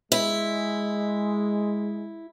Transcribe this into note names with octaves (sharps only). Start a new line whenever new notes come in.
G#3 E4